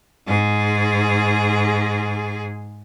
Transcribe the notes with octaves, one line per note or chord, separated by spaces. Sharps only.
G#2 G#4